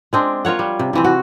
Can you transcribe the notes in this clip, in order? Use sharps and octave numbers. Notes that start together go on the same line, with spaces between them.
G#3 C4 D4
F4 A#4 C#5 F#5
G3
C3
C3 E3 C4
F#4